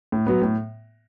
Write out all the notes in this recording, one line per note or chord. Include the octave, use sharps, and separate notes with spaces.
A2
F#3 B3
A2